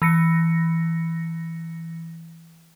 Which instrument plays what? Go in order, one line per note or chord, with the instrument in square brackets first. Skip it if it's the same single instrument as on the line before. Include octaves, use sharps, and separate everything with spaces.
[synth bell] E3 A#6 C#7